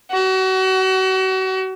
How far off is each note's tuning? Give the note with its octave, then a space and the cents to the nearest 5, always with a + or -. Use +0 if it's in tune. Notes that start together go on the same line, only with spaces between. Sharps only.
F#4 +35